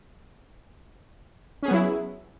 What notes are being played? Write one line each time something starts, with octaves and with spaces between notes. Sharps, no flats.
F#3 B3 C#4 E4 G#4